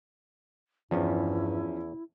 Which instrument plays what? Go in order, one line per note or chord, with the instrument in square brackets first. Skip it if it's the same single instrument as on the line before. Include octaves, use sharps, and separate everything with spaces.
[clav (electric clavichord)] E2 [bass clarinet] G2 [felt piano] F3 C#4 [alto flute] E4